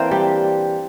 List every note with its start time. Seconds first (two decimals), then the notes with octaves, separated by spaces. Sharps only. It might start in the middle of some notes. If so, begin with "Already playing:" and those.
Already playing: E3 A#3 C4 D4 A#4 C5
0.11 G3 G4